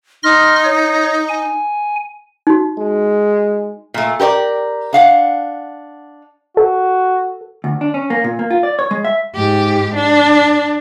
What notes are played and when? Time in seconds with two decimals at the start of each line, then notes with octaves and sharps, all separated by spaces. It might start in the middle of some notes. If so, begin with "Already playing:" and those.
0.23 D#4 C6 F6 A#6
0.64 C#5
1.29 G#5
2.47 D#4 F#4
2.79 G#3
3.94 A#2 A3
4.20 G4 A#4 C5 D5
4.93 D4 F5 F#5
6.57 F#4 A4
7.64 D2
7.81 D4
7.94 C#4
8.10 A#3
8.24 A#2
8.39 A#3
8.51 F4
8.63 D5
8.79 C#5
8.91 G#3
9.05 E5
9.35 G#2 G4
9.95 D4